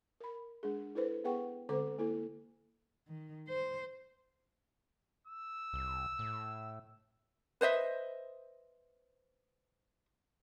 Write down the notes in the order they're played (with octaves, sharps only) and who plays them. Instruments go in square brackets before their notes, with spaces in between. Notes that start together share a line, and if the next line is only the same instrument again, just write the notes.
[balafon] A#4 B5
G#3 D4 G#4
E4 A4 B4 C5
B3 G#4 B4 F#5 G5 C#6
D3 G#3 C4 A4 C5 D6
A#3 E4 A4
[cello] D#3
C5
[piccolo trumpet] E6
[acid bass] C2
A2
[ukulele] B4 C5 D#5 E5